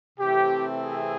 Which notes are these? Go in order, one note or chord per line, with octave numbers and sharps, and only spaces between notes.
C3 E3 A3 C4 G4
G#4